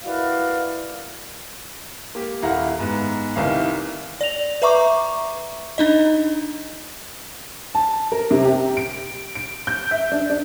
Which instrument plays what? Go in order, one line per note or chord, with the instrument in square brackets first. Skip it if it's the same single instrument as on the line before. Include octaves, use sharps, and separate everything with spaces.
[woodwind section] E4 F#4 A#4 B4 D5 F5
[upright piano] A#3 G4
D#1 E4 F5 F#5 A#5
G#2 B3
C2 D#3 E3 F5
[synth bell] D5 F7
B4 E5 A#5 C#6 D6
D4 D#4 D#5
[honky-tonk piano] A5
A#4
C3
G4
D7
D7
G6
E5
D4
D4